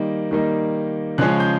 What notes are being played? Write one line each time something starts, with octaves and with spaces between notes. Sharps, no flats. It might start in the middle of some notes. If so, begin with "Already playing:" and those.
Already playing: D#3 G3 A#3 D#4
D#3 G3 A#3 D#4
C#3 F3 G#3 C#4 F#6
G6